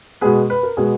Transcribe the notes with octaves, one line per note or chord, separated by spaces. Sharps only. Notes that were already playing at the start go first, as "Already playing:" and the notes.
B2 G#3 B3 G#4 B4
B4
A#4
B2 G#3 B3 G#4